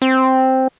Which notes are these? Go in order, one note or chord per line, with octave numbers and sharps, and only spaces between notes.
C4